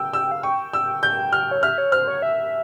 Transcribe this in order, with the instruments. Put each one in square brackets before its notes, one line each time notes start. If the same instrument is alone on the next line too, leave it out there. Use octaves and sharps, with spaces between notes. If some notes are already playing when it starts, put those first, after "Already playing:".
Already playing: [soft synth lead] G5 [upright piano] E6
[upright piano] E6
[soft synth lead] F5
[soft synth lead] G5 [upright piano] C#6
[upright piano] E6
G6
F6
[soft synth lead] C#5
[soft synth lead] E5 [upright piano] F6
[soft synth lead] C#5
[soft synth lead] C5 [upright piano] F6
[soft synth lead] C#5
E5